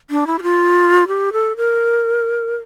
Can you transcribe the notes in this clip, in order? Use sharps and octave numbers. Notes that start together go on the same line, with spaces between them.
D4
E4
G4
F4
G4
A4
A#4